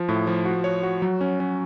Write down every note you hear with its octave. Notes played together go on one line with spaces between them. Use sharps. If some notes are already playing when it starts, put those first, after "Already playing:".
Already playing: F3
A2
F3
F#4
C#5
F#4
F#3
C#4
C#4